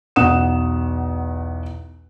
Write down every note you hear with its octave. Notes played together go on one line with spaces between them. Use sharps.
B1 E2 F#5 D#6 E7